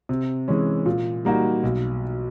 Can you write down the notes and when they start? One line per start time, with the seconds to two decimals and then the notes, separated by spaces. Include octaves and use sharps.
0.09 C3
0.48 E3 G#3 C#4
0.86 A#2
1.25 G3 A#3 D#4 F#4
1.63 B1